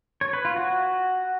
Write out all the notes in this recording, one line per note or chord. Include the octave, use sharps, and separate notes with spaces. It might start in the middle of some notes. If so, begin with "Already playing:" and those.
C#5
B4
F4
F#4